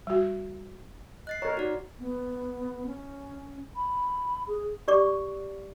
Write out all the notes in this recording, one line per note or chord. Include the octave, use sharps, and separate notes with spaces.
G3 F#4
D#5 F#6 A6 C7
A#4 C#5 A#5
D#4 F#4 D5
B3
C#4
B5
G#4
G4 D5 C#6 D6